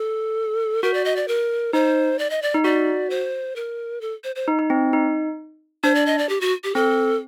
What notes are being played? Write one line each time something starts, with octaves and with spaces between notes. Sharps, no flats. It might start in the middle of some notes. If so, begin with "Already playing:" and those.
Already playing: A4
F#4 A#4
D5
D#5
D5
A#4
D#4 C5
D5
D#5
D5
D#4
F#4 D5
C5
A#4
A4
C5
C5
D#4
D#4
C4
D#4
D4 C5
D5
D#5
D5
G4
F#4
G4
C4 A4